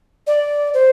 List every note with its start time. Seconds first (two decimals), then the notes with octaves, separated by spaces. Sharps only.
0.27 D5
0.73 C5